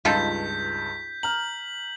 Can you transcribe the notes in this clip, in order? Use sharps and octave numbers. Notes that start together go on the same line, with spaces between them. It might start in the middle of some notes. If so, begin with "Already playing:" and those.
C#2 G2 D#4 F4 A4 G6 B6
A#5 F6 F#7